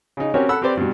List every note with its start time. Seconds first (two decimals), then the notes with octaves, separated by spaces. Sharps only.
0.17 C#3 D#4
0.34 C4 C#4 F#4 G4 A#4 C#5
0.49 A4 F#5 B5 E6
0.62 C4 G4 B4 C5 D5
0.77 G2 B2